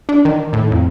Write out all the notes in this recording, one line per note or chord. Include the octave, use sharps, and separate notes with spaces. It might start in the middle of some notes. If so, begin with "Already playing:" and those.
D4
D#3
A2
F2